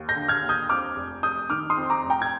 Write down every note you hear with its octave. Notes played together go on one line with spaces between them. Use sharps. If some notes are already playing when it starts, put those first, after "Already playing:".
Already playing: D#2
G6 A#6
D3
F6 G#6
D#2
D#6 G6
F2 D6 F6
F1
F1 D#6 G6
D#3 D6 F6
C6 D#6
F2
A#5 D6
F1
G5 A#5
G#6